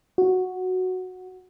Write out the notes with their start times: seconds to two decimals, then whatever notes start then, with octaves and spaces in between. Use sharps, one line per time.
0.18 F#4